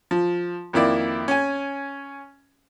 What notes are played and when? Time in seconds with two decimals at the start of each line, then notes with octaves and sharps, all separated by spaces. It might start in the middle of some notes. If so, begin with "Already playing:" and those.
0.11 F3
0.73 F2 D#3 A#3 E4 D5
1.28 C#4 G#5